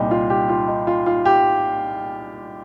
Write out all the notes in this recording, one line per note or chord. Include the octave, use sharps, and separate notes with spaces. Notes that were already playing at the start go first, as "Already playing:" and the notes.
Already playing: C2 A#2 D#4 G4
F4
G4
F4
D#4
F4
F4
G4